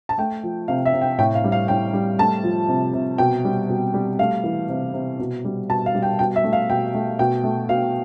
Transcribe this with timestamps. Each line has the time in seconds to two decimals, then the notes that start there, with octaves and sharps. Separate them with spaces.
0.09 A5
0.18 A3 G5
0.43 F3
0.68 C3 F5
0.86 E5
0.93 C3
1.02 G5
1.18 A2 G5
1.35 F5
1.44 G3
1.52 F5
1.68 A2 G5
1.93 G3
2.18 A3 A5
2.44 F3
2.68 C3
2.93 C3
3.18 B2 G5
3.44 G3
3.69 B2
3.94 G3
4.19 A3 F5
4.43 E3
4.69 C3
4.94 C3
5.19 B2
5.45 G3
5.69 B2 A5
5.86 F5
5.95 G3
6.02 G5
6.19 B2 G5
6.36 E5
6.44 A3
6.53 F5
6.69 B2 G5
6.95 A3
7.19 B2 G5
7.44 A3
7.69 B2 F5